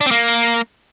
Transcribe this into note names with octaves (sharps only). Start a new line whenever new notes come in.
D4
C4
A#3